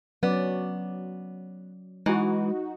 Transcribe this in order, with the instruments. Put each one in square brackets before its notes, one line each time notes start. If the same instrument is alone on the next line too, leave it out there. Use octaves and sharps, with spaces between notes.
[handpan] F#3 C#4 D5 [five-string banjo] B3
[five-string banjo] E3 [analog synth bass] G#3 [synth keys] D#4 F#4